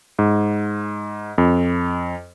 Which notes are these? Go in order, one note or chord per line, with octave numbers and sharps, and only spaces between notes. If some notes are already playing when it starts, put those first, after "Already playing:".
G#2
F2